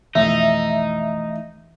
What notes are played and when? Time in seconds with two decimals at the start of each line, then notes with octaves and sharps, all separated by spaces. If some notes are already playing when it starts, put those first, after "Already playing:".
0.15 B1 F2 E3 A3 D#4 E5